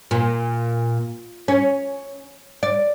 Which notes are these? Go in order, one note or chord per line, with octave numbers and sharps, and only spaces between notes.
A#2
C#4
D5